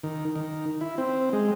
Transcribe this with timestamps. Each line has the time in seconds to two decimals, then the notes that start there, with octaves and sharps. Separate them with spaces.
0.03 D#3
0.36 D#3
0.81 E4
0.98 C4
1.33 G#3